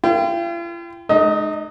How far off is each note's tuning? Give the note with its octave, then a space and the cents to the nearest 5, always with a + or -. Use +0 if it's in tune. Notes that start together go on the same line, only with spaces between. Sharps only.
F4 -45 G5 +0
G#3 +35 D#4 -30 D#5 +25